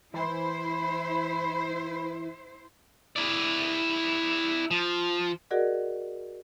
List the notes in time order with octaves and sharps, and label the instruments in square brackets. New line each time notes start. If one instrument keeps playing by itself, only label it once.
[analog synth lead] E3 [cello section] E4 C5 [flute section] B5
[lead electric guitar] E4 D5
F3
[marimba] F#4 G#4 A#4 D5 D#5 F#5